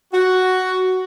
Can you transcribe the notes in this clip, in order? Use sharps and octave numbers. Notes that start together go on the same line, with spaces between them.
F#4